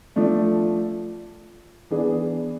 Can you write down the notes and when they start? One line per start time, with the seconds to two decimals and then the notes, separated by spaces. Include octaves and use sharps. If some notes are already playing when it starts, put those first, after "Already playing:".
0.16 F3 A3 D4
1.90 E3 B3 D4 G#4